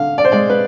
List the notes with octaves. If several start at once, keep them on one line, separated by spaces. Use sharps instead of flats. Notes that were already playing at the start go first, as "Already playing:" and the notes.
Already playing: D3 F5
D5
C5
G#3 D5
B4